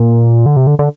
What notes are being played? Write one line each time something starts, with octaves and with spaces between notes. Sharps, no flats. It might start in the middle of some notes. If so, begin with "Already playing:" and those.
Already playing: A#2
D3
C3
D3
D3